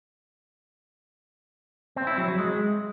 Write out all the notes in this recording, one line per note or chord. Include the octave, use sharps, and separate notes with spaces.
C4
E4
F#3
F#3
G#3